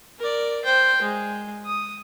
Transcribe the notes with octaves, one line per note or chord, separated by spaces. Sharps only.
A#4 D5
C5 G5
G#3
D#6